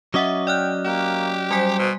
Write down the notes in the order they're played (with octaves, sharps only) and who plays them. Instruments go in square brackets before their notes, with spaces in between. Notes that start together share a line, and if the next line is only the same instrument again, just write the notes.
[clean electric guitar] F#3 C#4 D#5 [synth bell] E5 F#5 D6
[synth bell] D5 F6 F#6 [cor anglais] G5
[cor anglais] A#3 [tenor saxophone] G4
[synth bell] G3 G#5 B6 [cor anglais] C5
[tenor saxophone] B2